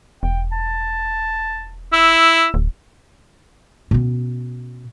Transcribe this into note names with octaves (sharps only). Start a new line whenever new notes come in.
E1 G5
A5
E4 E6
D1
B2 C#4